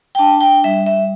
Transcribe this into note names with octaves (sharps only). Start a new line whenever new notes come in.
G5
D4 A5
D4 G5
G3 E5
G3 E5